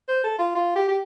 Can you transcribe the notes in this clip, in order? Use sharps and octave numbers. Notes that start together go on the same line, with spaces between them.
C5
A4
F4
F4
G4
G4